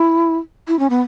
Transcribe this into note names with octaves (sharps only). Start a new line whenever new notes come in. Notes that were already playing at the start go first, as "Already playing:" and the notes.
Already playing: E4
E4
C#4
B3